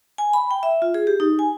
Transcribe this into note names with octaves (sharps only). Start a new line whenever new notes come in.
G#5
B5
G5
E5
F4
G#4
G4
D#4
G#5